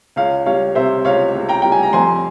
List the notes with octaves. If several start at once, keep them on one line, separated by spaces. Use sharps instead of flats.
C#2 C#5 F5
G3 C#5 F5
C3 C5 E5
C#2 C#5 F5
C#2
G5 A#5
G3 G5
G#5
A#5
F2 G#5 C6